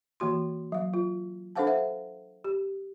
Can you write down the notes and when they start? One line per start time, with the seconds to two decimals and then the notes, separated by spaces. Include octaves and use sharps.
0.20 E3 A#3 F#4 C6
0.72 F#3 F5
0.94 F4
1.55 D4 A4 C5 F5 F#5 A5
1.67 C5 E5 F#5
2.44 G4